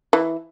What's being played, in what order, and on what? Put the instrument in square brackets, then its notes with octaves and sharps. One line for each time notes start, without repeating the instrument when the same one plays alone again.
[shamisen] E3